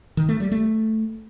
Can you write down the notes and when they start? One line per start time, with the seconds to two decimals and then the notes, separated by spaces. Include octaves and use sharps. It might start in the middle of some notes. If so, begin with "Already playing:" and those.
0.17 D#3
0.29 A3
0.40 G3
0.52 A3